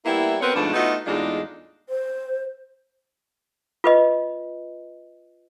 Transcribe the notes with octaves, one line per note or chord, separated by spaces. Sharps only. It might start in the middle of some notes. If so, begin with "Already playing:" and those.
G3 A#3 B3 E4
B3 C4 F#4 A#4 B4 C#5
G#2 B2 F3 A3 D4
A3 B3 D#4 F4 F#4
E2 A2 G#3 D4 D#4 F4
C5
F4 B4 D#5